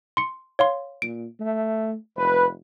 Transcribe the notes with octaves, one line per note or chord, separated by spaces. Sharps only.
C6 C#7
C#5 F5 C6
A#2 D7
A3
F1 B4